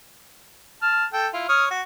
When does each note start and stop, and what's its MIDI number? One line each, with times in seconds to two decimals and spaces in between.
0.82 1.05 81
0.82 1.05 89
1.13 1.28 69
1.13 1.28 79
1.34 1.45 64
1.34 1.45 65
1.49 1.66 73
1.49 1.66 87
1.49 1.66 89
1.70 1.82 66